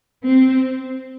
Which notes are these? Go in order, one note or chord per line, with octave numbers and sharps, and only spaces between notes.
C4